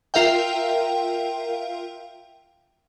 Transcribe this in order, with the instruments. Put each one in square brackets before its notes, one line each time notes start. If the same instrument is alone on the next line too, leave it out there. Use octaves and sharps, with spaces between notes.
[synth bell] F4 A#4 E5 F5 G5